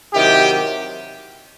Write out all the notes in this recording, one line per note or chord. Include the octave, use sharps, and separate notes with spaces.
C3 D#3 F#3 E4 G4